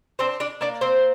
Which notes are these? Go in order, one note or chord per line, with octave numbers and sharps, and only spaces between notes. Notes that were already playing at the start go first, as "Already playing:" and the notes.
C4 D4 C5
D4 D5
A#3 D4 D5
C4 C5